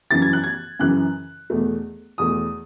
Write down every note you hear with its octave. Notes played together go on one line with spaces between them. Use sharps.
F#2 C#3 E3 A6
G#6
F#6
G#6
F#2 C#3 E3 F#6
E2 B2 A3
E2 B2 A3 D#6